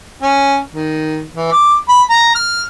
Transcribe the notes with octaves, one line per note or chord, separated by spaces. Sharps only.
C#4
D#3
E3
D6
B5
A#5
F6